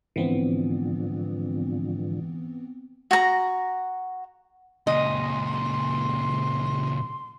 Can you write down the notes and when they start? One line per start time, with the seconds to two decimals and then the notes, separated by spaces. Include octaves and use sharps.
0.16 G#2 D3 E3 F3 B3 C4
3.11 F#4 A#5
4.87 C#2 A#2 D#5 C6